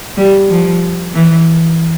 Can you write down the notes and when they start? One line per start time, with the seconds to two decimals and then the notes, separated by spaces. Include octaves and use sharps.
0.17 G3
0.49 F3
1.14 E3